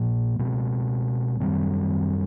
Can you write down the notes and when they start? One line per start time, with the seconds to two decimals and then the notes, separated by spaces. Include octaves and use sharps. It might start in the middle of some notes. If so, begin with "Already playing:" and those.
Already playing: A#2 F3 A#3
0.39 B2 G#3 C4
1.40 F#2 D#3 G3 C4